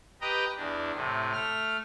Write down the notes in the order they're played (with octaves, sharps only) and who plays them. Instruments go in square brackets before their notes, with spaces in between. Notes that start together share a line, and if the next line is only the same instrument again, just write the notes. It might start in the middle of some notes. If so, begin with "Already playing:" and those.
[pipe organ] G4 B4 D#5 G5 A#5 D#6
E2 D4
A2 C3
A3 F6